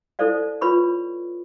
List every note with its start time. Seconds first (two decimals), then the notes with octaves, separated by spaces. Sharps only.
0.19 D#4 E4 A4 C5 D5 F5
0.61 F4 B4 C#5 B5 C#6